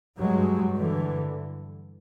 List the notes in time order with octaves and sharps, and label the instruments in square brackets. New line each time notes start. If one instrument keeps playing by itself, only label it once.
[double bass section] G2 F#3 G#3
D3 E3